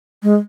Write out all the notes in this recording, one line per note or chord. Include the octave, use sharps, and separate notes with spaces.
G#3